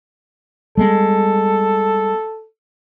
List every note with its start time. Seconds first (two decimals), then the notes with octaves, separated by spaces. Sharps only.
0.77 G3 G#3 B3 A4